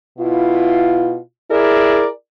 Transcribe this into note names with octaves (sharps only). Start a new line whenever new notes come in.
B2 E4 F4
E4 G#4 A#4 D5